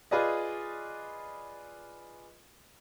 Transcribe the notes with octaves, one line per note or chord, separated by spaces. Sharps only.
F4 G#4 B4 D5 D#5